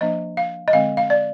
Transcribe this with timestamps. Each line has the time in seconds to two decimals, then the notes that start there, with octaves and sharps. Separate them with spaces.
0.01 F3 A#3 D4 D#5
0.37 F5
0.68 D#5
0.73 D3 G#3 C4 F5
0.97 F5
1.10 D5